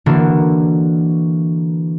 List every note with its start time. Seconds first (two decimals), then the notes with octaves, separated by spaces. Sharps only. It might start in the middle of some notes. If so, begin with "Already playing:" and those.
0.06 D3 E3 A#3 D4 F#4